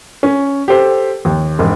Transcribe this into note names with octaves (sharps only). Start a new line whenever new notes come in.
C#4
G4 A4 C5
D#2
E1 G#2